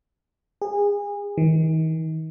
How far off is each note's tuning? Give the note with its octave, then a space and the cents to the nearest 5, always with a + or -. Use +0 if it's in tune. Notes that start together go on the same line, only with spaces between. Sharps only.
G#4 -30
D#3 +40